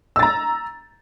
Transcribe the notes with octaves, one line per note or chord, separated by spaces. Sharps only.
A#5 E6 A6